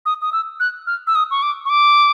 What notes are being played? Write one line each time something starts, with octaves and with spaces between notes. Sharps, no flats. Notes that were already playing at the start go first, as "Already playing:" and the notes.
D#6
D#6
E6
F#6
F6
E6
D#6
C#6
D6
C#6
D6